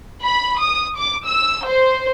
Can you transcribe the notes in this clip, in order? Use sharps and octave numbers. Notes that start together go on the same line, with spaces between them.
B5
D#6
D6
E6
C5